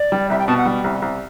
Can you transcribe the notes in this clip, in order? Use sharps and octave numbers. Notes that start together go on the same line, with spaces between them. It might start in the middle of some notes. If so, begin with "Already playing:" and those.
Already playing: D5
G3
C2 E5
G5
B2 A5
F#5
G3
C2
C2